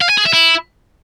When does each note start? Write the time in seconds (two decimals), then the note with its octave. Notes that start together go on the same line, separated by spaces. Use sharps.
0.02 F5
0.10 G#5
0.17 G#4
0.25 E5
0.33 E4